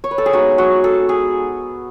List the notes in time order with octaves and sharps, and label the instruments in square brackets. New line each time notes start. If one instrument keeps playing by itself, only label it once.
[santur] C#5
B4
A4
G#4
G#3 B3 D#4 F#4
F#4
A4
G#4